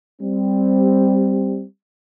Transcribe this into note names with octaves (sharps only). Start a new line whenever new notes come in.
G3 C4